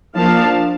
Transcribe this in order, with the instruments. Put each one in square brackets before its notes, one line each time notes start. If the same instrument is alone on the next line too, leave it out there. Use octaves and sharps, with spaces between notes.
[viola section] F3 A#3 D4 F5 A5